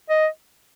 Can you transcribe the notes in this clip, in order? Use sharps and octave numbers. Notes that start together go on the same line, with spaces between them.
D#5